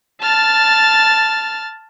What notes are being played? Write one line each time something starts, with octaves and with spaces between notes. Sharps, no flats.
A5 F6 A6